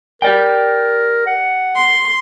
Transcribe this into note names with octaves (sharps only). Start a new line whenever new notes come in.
G4 A#4 D5 G5
F#5
C6